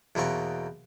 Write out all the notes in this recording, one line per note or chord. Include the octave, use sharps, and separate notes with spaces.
E2 B2 A#3 C4 C#6